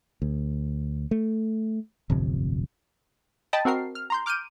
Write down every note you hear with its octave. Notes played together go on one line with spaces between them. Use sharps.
D2
A3
D1 G1 F2 C3
D#5 G5 A5 B5 D#6 A6
C4 F#4 A#4 C7
F6
A#5 C6 G6
D6 F6 G6 D7 D#7